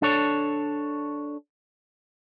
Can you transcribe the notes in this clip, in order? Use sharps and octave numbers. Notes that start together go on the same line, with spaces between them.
D4 A4 C#5